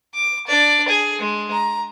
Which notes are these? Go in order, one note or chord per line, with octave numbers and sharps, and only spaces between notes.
D6
D4 D5
G#4
G#3
A#5